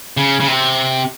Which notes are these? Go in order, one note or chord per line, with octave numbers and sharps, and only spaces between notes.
C#3
C#3
C3